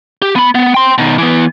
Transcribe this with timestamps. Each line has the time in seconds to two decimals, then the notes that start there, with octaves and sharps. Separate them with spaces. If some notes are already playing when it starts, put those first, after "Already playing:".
0.22 G4
0.36 B3 B5
0.55 B3
0.74 G5 C6
0.98 B2 D#3
1.18 E3 B3